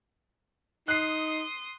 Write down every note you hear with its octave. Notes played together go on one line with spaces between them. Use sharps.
D#4 C6 D#6 F#6 C7